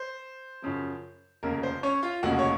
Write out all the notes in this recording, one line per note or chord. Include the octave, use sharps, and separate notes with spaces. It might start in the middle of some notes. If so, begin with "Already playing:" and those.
Already playing: C5
F#2 C#3 F3
F1 D#2 C#3 A#4
C5
C#4 C#5
F4 F5
F1 D#2 C#3 F#4 F#5
C#5